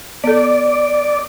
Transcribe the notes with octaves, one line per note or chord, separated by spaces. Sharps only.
B3 A4 D5